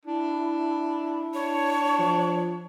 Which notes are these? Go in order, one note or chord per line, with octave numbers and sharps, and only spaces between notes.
D4 E4
D4 C#5
F3